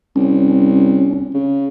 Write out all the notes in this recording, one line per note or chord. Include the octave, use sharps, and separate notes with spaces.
C2 C#4
C#3